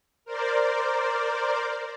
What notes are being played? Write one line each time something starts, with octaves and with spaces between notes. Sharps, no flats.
A#4 C5 D5